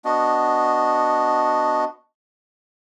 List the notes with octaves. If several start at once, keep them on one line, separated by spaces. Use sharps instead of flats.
B3 D4 F#4 D#5